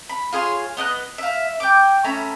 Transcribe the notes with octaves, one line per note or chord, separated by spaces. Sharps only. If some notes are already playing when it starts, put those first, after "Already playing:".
B5
F4 G#4 C#5 C6
B3 D#5 D6 F#6
E5 F5
G5 D6
A3 C#4 A#5 B5